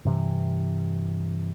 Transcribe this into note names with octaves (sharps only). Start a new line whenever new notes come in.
G2 C3 E3